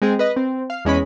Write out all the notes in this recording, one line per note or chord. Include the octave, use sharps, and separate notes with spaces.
G#3 C4 G#4
B4 D#5
C4
F5
E2 G#3 C#4 B5